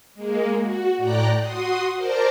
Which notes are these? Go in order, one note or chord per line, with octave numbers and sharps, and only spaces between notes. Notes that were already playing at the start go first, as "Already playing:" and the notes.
G#3 A#3
F#4
A2 D5 G5 A#5 F#6
F#4 C6 D#6
A#4 C5 D5 A5 A#5